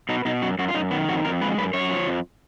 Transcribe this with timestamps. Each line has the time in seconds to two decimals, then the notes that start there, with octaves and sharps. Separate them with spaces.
0.09 B2 D#4
0.25 B2 D#4
0.42 F#2 F#4
0.59 F#2 F#4
0.68 F4
0.74 F#2 D#4
0.91 D#3 B3
1.09 F2 F#4
1.25 F2 A#4
1.41 G#3 B4
1.58 F#2 B4
1.73 F#2 C#5
1.90 F3
2.08 F2